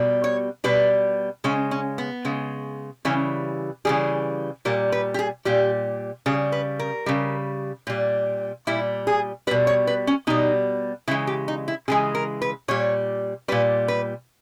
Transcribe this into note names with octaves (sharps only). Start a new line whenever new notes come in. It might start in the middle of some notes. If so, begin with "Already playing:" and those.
Already playing: B2 G3
C#5
B2 G3 B4
C#3 G#3 C#4
C#4
B3
C#3 G#3
C#3 E3 G3 C#4
C#3 E3 G3 G#4
A#2 G3 A#4
B4
G4
G#4
A#2 G3 G4
C#3 G3 G#4
B4
A#4
C#3 G3
A#2 G3
A#2 G3 E4
G#4
B2 G3 B4
C#5
B4
C#4
B2 G3 D#4
C#3 E3 G#3 E4
G4
D#4
E4
C#3 E3 G#3 G#4
A#4
B4
A#2 G3 C#5
A#2 G3 B4
B4